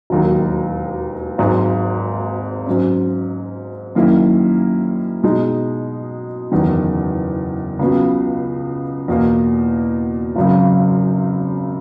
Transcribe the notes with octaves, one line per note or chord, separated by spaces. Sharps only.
E1 D#2 D#3 F#3
G#1 G#2 F#3
G#2 F#3 C#4
F#2 D#3 A#3 C#4 E4
B2 G#3 D#4
F#1 E2 D#3
C#2 C#3 F#3 B3 F#4
E2 B2 A#3
G#1 F#2 C#3